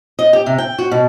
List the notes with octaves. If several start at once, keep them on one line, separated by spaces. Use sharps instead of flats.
D#5
G4
C3
G5
F#4
B2